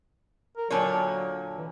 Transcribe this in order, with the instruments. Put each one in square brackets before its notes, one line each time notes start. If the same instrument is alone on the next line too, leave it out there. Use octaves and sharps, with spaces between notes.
[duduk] A#4
[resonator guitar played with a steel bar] A#2 D3 C#5 [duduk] F#3
[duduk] E3